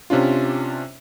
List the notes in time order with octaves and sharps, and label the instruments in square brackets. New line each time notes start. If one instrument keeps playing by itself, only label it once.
[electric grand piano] C3 C#4 D4 F4